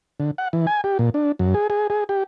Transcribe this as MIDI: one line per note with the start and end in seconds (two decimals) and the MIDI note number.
0.20 0.31 50
0.38 0.48 78
0.53 0.66 52
0.67 0.81 80
0.84 0.98 67
0.99 1.10 46
1.14 1.32 62
1.39 1.54 42
1.54 1.67 68
1.70 1.87 68
1.90 2.04 68
2.09 2.23 67